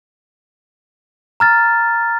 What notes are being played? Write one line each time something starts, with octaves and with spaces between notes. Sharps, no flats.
A#5 F6 A6